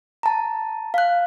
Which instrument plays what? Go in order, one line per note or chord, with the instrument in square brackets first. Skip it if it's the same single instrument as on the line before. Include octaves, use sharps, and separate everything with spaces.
[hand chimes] A5 A#5
F5 F#6